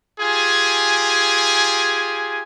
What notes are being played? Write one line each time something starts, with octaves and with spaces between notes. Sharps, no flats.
F4 G4 G#4 G#5